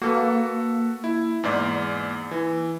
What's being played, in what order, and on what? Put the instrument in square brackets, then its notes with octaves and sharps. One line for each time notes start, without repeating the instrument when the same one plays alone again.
[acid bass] A#3 [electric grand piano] F#4 A4 B4
[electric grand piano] E4
E2 G#2 D5
E3